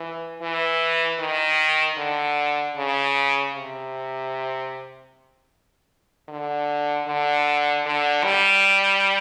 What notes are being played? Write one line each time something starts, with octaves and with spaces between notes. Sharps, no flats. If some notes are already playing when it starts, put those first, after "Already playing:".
Already playing: E3
E3
D#3
D3
C#3
C3
D3
D3
D3
G3